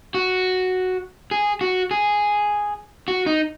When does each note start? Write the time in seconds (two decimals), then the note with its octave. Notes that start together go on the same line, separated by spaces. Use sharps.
0.14 F#4
1.31 G#4
1.61 F#4
1.91 G#4
3.08 F#4
3.26 D#4